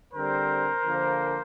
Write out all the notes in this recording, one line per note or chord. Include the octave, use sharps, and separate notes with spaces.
D3 G3 C4 A#4 C5
D3 F3 A#3